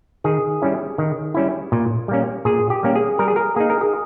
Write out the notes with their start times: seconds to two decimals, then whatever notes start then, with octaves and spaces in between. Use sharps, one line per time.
0.24 D#3 G#4
0.62 G3 C#4 E4
0.98 D#3
1.34 G3 C#4 E4
1.72 A#2
2.08 G3 A#3 C#4
2.45 A#2 G#4
2.70 G4
2.83 G3 A#3 C#4
2.95 G#4
3.19 G3 A#4
3.28 G#4
3.36 A#4
3.56 A#3 D#4 G#4
3.70 A#4
3.81 G#4